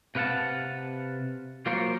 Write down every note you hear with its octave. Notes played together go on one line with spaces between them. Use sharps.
C3 B4 F5 F#5 A5
F#3 A#3 F4 A#4 C5 C#5